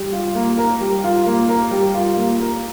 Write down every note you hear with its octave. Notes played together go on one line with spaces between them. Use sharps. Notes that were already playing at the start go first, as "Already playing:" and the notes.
Already playing: G3
F4
A#3
A#4
G3
F4
A#3
A#4
G3
F4
A#3
A#4